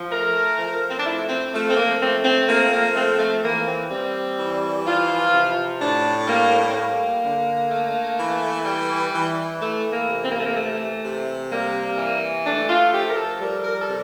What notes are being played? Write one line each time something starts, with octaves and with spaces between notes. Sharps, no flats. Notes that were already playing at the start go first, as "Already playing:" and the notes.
Already playing: F3
A3 A#4
F3
C4
D4
A3 E4
C4
F3 A3
C4
A#3
A3 C4
C4
F3 A#3
A#3
A3 C4
A3
E3 A#3
C4
G3 C4
E3
F3 F4
C3
A2 D4
G3 A#3
C4
G3 A#3
D3
A3
E3
G3
E3
E3 A3
A#3
C3
C4
A#3
A3
A#3
E3 A3
C3
G3 A#3
E3
A3 D4
F4
F3 G4
A#4
A4
G3 A#4
A#4
A4
C3